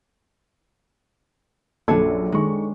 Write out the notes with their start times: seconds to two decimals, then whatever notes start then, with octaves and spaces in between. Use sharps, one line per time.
1.88 A#1 F#2 D4 A4 B4 C#5
2.32 D#3 G#3 C#6